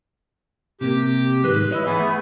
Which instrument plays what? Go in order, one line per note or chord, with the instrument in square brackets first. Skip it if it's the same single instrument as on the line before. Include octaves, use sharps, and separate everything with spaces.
[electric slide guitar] C3 A#3 [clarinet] G4
[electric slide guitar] G#2 D#3 G#3 [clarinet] B4
[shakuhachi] E4 [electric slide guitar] C#5 D#5
[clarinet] E3 [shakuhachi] B3 [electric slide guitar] G#4
[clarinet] A3